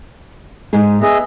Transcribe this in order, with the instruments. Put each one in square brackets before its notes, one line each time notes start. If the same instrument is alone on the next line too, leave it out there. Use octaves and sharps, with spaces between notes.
[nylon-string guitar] G#2 G#3 G#4
[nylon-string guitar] B3 [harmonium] G#4 D#5 E5